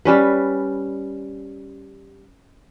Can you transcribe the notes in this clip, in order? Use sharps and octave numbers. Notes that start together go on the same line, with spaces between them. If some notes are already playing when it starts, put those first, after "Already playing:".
G3 C#4 B4